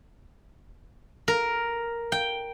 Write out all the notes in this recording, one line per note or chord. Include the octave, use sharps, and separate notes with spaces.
A#4
G5